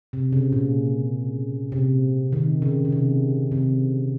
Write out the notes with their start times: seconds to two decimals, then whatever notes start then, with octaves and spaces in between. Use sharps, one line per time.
0.13 C3
0.32 C#3
0.52 A#2
1.72 C3
2.33 D#3
2.62 C#3
2.85 C#3
2.92 C3
3.52 C3